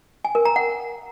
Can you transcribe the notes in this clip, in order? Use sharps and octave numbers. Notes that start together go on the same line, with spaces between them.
G#5
A#4
A#5
F#5